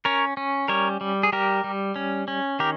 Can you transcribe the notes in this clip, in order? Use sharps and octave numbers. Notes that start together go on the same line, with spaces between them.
C#4 A#4 C#5
C#4
G3 A#4 C#5
G3
G#4
G3 G4 A#4
G3
C#4
C#4
D#3 G4 A#4